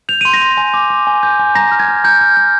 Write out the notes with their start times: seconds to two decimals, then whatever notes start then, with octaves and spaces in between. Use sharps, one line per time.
0.09 G6 F7
0.21 C6 D#7
0.33 A#6
0.41 C6
0.57 G#5
0.74 D6
0.90 D6
1.07 G#5
1.23 G6
1.39 G#5
1.55 A#5 A#6
1.72 F6
1.79 G#6
1.88 F6
2.04 A#5 G6
2.21 F6
2.37 F6